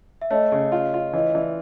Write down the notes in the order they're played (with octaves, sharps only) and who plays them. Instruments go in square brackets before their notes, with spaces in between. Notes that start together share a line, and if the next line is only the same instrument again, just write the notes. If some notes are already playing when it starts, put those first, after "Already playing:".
[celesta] E5
[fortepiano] A3 [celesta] C#5 D#5
[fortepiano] C#3
F4
F4
[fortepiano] E3 [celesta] C#5 D#5
[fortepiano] E3 [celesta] D5 E5